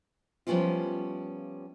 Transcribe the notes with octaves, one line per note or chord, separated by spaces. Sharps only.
F3 G3 B3 C#4 E4 F4